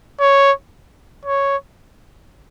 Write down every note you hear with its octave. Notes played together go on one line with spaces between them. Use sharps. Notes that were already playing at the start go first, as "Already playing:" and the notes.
C#5
C#5